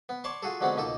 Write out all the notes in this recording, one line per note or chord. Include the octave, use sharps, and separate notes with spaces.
B3
C#5 D5 A5 C6 C#6
F4 F#4 G#4 A4
D3 F#3 G#3 B3 C4 F#4
C#2 B2 A#3 D#4 A4